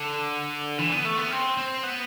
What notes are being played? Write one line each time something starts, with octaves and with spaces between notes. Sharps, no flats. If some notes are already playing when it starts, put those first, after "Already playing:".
Already playing: D3
E3
B3
A3
B3
C4
C4
B3